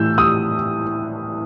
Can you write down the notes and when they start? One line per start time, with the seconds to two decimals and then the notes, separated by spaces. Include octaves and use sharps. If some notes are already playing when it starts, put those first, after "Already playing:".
Already playing: A2 E3 E6 G6
0.18 D#6